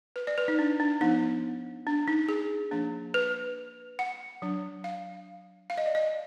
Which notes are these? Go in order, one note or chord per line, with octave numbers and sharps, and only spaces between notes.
B4
D5
B4
D#4
D4
D4
F3 B3 D4 D#4
D4
D#4
G#4
F3 A#3 D4
B4
F#5
F#3 D4
F5
F5
D#5
D5
D#5